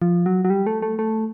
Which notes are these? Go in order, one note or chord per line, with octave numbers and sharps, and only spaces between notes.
F3
F#3
F#3
G3
A3
A3
A3